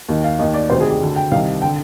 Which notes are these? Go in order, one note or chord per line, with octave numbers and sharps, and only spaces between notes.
D#2 D#3
F5
D#2 D#3 D#5
D5
D2 C3 D#3 C5
G#4
G4
D2 D3
G5
C2 C3 D#3 F5
D3 G5